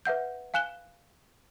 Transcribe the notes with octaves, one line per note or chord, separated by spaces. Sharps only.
B4 E5 F#5 G6
F5 G#5 F#6 E7 G7